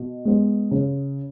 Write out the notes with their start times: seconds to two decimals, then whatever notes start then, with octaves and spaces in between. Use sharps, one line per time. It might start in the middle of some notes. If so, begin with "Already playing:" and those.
Already playing: B2
0.25 G#3 B3
0.71 C#3